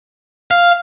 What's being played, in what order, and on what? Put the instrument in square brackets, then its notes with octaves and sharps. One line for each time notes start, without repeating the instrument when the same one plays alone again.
[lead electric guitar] F5